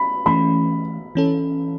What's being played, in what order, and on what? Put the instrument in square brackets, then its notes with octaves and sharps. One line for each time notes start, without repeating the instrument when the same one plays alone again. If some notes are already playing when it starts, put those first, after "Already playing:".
Already playing: [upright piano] B5
[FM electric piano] E3 A3 C#4 [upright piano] B5
[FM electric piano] E3 C#4 A4